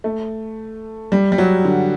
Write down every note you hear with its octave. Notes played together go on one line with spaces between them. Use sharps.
A3
G3
G3
F#3
D3